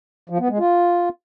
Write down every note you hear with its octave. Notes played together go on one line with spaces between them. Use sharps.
F3
B3
G#3
F4